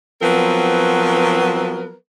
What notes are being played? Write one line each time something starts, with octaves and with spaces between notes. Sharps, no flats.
F3 F#3 B3 C4 A#4 B4